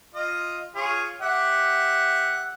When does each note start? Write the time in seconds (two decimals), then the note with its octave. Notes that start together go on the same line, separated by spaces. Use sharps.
0.15 F4 D#5
0.75 F4 G#4 C#5
1.22 G4 E5 F#5